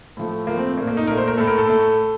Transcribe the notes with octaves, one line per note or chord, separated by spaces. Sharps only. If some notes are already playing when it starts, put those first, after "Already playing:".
A2 F3 A3
A2 F3 A3 A#3
C4
A#2 A3 A#3
A#3
D#4
A#2 A3 A#4
C5
A#4
A2 A3 A4
A#4
A4
A2 A3